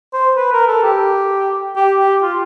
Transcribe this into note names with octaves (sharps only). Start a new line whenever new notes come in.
C5
B4
A#4
A4
G4
G4
G4
F4